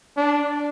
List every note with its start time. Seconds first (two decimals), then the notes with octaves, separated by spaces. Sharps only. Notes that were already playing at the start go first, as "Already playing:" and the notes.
0.17 D4